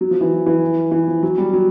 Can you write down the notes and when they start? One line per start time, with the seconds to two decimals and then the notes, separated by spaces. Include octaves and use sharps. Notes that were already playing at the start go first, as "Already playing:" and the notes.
0.01 F#3
0.11 F3
0.21 E3
0.31 F3
0.46 E3
0.91 E3
1.08 F3
1.23 F#3
1.38 G3
1.53 F#3